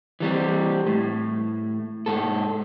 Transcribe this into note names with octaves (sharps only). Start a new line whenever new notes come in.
E3 G3 C4
A2
G#2 A4